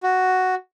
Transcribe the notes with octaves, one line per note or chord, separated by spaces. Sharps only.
F#4